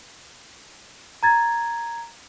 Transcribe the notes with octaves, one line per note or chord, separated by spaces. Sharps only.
A#5 G#6 A6